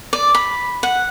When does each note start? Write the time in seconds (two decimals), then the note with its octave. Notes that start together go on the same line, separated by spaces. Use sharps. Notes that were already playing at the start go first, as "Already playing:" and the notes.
0.13 D5
0.35 B5
0.83 F#5